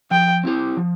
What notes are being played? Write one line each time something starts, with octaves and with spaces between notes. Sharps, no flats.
F3 G5
C4 E4 G4 C5
F3